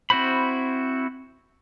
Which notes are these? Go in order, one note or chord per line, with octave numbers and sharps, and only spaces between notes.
C4 E4 F#4 C5 B5